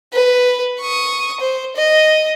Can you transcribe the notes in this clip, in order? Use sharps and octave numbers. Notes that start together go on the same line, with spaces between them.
B4
C#6 D#6
C5
D#5